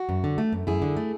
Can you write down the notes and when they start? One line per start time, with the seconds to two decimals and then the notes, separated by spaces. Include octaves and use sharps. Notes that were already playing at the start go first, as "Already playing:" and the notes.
Already playing: F#4
0.09 F#2
0.24 D3
0.38 A3
0.53 F#2
0.67 F#2 E4 G#4
0.82 D3
0.97 A3